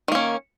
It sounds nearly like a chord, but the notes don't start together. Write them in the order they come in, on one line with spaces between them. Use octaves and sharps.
D#3 A#3 C#4